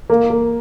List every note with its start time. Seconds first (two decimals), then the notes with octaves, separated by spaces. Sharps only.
0.10 A#3
0.30 A#3